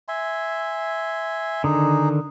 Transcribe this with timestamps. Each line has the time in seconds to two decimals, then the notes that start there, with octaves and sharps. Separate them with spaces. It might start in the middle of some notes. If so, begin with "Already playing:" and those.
0.08 E5 G#5 C6
1.64 D3 D#3 D#4 G#4